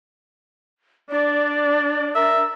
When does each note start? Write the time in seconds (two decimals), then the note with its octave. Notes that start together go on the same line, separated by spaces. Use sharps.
1.11 D4 D5
2.15 A#4 E5